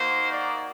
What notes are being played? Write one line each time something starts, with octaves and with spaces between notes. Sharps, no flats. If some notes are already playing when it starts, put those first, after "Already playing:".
Already playing: A#3 D#4 F#4 C5
D5